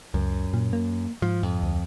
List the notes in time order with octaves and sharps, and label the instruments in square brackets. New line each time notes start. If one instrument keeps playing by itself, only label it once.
[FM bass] C#2 [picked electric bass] F#2
[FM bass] A#2
A#3
[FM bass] G#2 [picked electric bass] F3
[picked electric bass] F2
[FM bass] D2